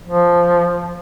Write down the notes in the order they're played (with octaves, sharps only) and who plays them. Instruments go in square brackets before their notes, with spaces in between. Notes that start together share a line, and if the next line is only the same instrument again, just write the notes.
[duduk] F3